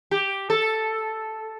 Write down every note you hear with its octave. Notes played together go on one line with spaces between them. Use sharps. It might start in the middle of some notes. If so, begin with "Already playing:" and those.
G4
A4